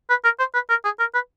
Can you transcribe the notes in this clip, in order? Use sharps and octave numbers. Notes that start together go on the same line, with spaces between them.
B4
A#4
C5
B4
A#4
G#4
A#4
B4